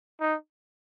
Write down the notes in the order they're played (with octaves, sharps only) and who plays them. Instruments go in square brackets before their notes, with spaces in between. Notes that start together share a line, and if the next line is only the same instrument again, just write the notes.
[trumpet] D#4